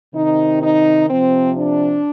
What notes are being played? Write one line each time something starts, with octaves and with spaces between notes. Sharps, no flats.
C3 D#3 D#4
D#4
C3 F3 C4
D4